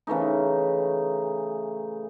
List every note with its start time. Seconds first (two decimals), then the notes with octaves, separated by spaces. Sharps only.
0.07 C#3 E3 A3 D#4